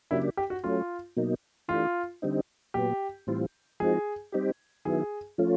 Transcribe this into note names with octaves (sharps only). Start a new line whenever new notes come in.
C#3 F#3 A#3 D4 E4 G4
G4
F#4
F#3 A3 C#4 F4
B2 F#3 A#3 D#4
E3 A3 D4 F4 G4
D3 G3 C4 D#4
A#2 F#3 B3 G4
A2 E3 G3 C4 F4
F3 G#3 C4 D#4 F#4 G#4
G3 C4 D#4 G4
D#3 F#3 B3 E4 G#4
F3 A3 C#4 F4